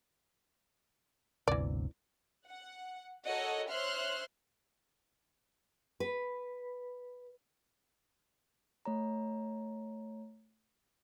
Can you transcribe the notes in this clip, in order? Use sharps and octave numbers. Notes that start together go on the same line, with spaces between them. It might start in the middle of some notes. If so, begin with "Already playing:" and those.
G1 D2 C3 E3 D5
F#5
F#4 A4 A#4 C#5 D#5 F#5
C5 C#5 E5 C6 F6 F#6
B4
A3 C#5 A#5